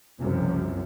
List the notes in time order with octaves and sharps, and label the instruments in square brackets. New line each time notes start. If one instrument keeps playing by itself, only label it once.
[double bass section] F#1 C2 F#2 C3 F3